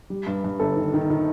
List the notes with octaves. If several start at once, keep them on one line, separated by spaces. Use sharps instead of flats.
G3
G2
G2
G1 A4
D#3
D#3
D#3